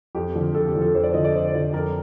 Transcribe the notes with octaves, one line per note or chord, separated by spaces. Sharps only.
F2 G4
D3 F3
F2 A4
G4
D3 F3
A4
F2 C5
D5
D3 F3 D#5
D5
F2 C5
D3 F3
F2 A#4